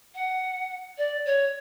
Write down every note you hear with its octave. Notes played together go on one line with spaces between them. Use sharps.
F#5
D5
C#5